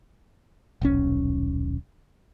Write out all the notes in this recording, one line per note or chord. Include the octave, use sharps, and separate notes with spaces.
D#1 B1 C#4